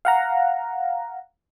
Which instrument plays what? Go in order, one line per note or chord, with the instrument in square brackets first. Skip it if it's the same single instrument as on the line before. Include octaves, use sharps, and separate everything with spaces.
[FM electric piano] F5 F#5 A#5